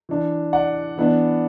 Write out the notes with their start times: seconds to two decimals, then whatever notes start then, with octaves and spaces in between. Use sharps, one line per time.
0.09 E3 D4
0.53 D5 F#5
0.97 E3 B3 D4